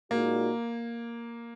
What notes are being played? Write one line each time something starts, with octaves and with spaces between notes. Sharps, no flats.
A#2 G#3 A#3 D#4 F#4